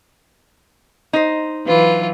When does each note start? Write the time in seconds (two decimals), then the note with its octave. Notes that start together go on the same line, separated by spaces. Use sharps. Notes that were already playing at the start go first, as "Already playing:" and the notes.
1.13 D#4 C5
1.67 E3 F#3 F4 B4